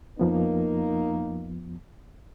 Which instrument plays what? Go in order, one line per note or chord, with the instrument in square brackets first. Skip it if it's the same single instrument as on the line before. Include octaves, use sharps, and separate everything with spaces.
[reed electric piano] F2 F3 B3 [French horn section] A#3 D#4